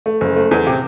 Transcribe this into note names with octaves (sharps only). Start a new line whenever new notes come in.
A3
F#1
A3
E2
C3